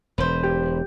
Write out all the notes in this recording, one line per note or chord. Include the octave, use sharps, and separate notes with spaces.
E1 B4 C5
G4